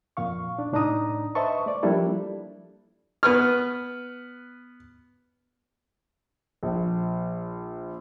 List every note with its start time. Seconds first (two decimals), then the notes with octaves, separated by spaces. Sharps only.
0.17 F2 A#2 F5 C#6
0.59 D4
0.72 C2 A2 D4 D#4 A#5 D#6
1.35 B4 C5 D#5 E5 A5 C#6
1.66 A3 D5
1.83 F3 G3 A#3 D4 E4 A4
3.23 B3 B4 F6
6.63 A#1